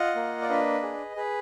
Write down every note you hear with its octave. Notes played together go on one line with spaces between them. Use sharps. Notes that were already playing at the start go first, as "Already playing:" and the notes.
Already playing: F4 D#5 F#5
A#3
D5
D4 B4 D#5
G#4
G#4 B4